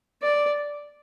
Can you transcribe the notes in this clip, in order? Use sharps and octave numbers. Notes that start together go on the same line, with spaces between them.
D5